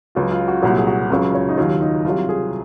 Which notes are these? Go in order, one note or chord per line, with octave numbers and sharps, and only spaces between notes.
C#2 C#3 F#3 F4
F4
F#4
C2 A#2 F#3 F#4
G#4
F#4
C#2 C#3 F#3 F4
C#5
D#4
D#2 D#3 F#3 F4
D#4
C2 C3 F#3 F4
G#4